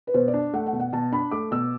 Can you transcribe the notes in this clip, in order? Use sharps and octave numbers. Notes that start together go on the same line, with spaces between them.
B4
B2 C5
D5
D4
A3 F#5
F#5
B2
F#5
B2 A5
D4 B5
A3 D6
B2 E6